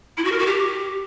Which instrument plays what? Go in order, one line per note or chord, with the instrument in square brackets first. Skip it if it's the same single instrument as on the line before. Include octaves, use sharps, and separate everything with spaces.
[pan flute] E4
F#4
A#4
F#4
G4